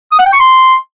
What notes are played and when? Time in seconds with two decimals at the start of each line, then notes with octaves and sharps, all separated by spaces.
0.12 D#6
0.19 F#5
0.26 G5
0.33 C#6
0.40 C6